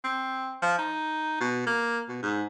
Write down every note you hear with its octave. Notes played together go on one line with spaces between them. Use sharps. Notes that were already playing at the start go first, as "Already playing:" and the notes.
C4
F3
D#4
B2
A#3
B2
G#2